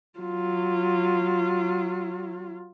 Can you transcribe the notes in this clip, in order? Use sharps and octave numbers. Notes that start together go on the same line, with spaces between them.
F#3 F4